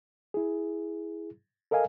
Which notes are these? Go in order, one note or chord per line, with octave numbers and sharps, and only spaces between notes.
E4 G#4
A4 A#4 D#5 F5 G#5